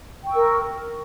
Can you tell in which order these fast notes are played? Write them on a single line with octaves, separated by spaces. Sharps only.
G5 C#6 E6 A#4